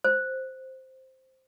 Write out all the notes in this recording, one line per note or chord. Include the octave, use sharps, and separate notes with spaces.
C5